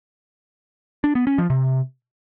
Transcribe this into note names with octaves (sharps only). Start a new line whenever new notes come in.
D4
B3
C#4
F3
C3